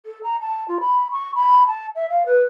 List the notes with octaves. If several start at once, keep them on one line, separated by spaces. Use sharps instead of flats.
A4
A#5
A5
F4
B5
C#6
B5
A5
E5
F5
B4